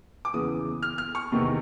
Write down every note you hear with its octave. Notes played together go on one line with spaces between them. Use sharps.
D6
E2 C#3 E3 D#6
F6
F6
C#6
E2 C3 D#3